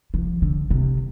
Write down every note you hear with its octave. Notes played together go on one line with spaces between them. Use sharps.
F3
D3
C3